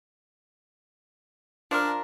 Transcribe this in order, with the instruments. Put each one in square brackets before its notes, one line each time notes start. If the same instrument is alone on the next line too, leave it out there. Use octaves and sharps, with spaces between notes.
[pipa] F3 A#4 [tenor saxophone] D4